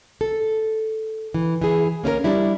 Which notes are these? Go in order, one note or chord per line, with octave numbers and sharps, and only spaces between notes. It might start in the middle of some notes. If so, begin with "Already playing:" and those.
A4
E3
E3 G#4
A#3 C#4 E4 A#4
G3 D4 E4